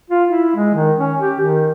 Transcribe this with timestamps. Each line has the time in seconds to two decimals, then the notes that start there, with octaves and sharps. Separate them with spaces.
0.10 F4
0.28 E4
0.56 G#3
0.74 D#3
0.98 C#4
1.20 G4
1.40 D#3